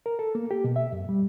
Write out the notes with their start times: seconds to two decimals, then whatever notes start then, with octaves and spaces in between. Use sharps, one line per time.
0.06 A#4
0.19 A4
0.35 A#3
0.51 G4
0.64 B2
0.76 E5
0.92 F#2
1.09 G3